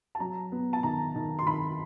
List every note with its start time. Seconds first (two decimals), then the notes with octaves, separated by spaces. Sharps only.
0.15 A5
0.20 F#3 A#5
0.52 B3
0.73 A5
0.83 D#3 A#5
1.15 D#3
1.39 C6
1.47 D#3 B5